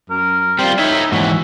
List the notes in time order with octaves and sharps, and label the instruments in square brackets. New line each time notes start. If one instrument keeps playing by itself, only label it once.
[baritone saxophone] F#2 [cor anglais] A#4
[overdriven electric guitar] G3 F4 [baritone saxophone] C4
[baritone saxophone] D#4 [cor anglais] E4 [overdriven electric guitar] C#5 E5
[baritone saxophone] D#2 [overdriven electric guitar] G#2 E3 [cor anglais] F#4